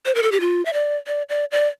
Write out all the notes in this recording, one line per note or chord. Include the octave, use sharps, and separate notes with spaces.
C5
A#4
A4
G4
F4
E5
D5
D5
D5
D5